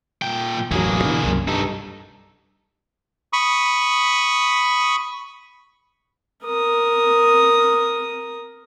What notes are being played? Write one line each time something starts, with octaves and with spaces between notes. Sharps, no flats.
A#2 G5
E1 A1 F#3 A#3 G#4
B2 D3 E3
C2 F#2
G2 D#4 A4
B5 C#6 D#6
A#4 D#6